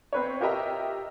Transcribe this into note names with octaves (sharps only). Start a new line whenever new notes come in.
C4 B4 C#5
F4 G4 A#4 D#5 E5 A#5